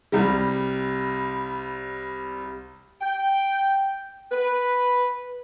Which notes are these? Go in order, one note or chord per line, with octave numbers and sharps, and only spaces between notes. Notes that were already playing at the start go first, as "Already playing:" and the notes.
C2 G3
G5
B4